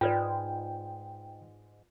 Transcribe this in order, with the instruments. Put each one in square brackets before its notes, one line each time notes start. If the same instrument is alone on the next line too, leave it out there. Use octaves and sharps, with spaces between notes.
[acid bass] G#2 [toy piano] F4 B4 D5 [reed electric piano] G5